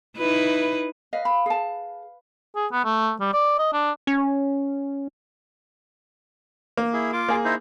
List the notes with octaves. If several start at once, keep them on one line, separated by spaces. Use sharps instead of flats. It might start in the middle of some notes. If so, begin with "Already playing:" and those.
D#4 E4 B4
B4 D#5 F5
B5
G#4 A5
G#4
B3
A3
G3
D5
D#5
D4
C#4
A#3
E4 G#4
F4 D6
A#3 G#4
D#4 E4 C5